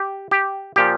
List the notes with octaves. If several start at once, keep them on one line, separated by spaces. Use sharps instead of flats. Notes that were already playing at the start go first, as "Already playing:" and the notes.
Already playing: G4
G4
A#2 F3 G4